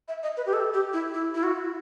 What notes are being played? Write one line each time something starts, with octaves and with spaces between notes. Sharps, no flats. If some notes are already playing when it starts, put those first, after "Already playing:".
E5
D#5
B4
G4
A4
G4
E4
E4
E4
F#4